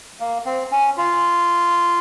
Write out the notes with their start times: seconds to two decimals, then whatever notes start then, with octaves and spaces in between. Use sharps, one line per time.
0.20 A#3
0.46 C4
0.72 C#4
0.97 F4